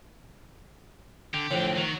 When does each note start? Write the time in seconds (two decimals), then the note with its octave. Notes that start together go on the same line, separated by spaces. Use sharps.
1.34 D3 G4
1.51 F2 A2 D3 C4
1.77 D#3 F#3 F#4